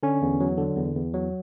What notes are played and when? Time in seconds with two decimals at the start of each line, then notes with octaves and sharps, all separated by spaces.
0.03 D3 C#4
0.22 E2
0.40 F#3
0.58 D3
0.77 E2
0.96 E2
1.14 F#3